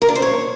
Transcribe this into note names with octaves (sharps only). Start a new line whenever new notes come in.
A#4
D4
C5
C#5